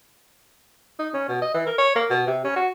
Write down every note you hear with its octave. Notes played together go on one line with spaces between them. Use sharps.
D#4
C#4
B2
D#5
E3
A#4
C#5
A#3
B2
C3
C#4
F#4